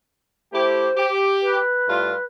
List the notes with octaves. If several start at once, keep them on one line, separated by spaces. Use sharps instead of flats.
A3 E4 G4 C5
G4
B4
A2 G3 F4